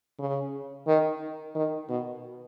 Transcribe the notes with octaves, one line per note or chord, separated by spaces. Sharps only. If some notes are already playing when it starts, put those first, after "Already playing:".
C#3
D#3
D#3
B2